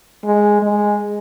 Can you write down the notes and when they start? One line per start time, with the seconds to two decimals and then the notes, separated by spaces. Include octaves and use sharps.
0.25 G#3
0.63 G#3